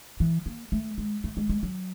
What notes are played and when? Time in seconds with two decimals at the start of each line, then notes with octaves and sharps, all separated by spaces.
0.20 E3
0.46 A#3
0.72 A3
0.98 G#3
1.24 A3
1.37 G#3
1.49 G#3
1.63 F#3